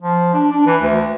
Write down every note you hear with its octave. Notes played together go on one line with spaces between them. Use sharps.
F3
D4
D4
E3
D2